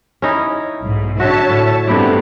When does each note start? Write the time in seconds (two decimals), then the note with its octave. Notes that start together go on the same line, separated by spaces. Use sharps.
0.22 C#4 D#4 E4
0.83 B1 G#2
1.20 D3 F#4 C#5 E5 A5
1.49 A2
1.87 G2 C3 A3 B3 E4 G4